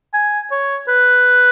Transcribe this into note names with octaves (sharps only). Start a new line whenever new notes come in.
G#5
C#5
B4